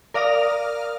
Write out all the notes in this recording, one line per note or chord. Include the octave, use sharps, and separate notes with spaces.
A#4 D5 F5 A#5 D#6 F6